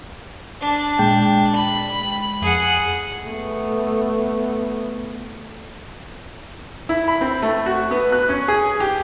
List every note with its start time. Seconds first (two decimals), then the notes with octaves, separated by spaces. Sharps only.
0.61 D4
0.99 A#2 G#3 G5
1.56 B5
2.42 F2 G#4 F#5
3.24 A3 B3
6.89 E4
7.08 B5
7.21 C4
7.42 A3
7.66 F#4
7.91 B3
8.12 F#6
8.29 C#4
8.48 G#4
8.80 G4